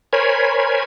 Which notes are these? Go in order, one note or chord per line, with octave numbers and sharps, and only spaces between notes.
A#4 C5 C#5 G#5 B5